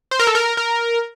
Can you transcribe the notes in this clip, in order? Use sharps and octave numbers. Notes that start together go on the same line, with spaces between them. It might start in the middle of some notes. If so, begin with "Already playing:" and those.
C5
A#4
A4
A#4
A#4